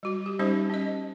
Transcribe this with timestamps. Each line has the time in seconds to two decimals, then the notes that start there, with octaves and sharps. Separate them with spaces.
0.03 G3 F#4
0.26 G4
0.39 G3 C#4 D#4 G4 C5 E5
0.69 C#4 D#5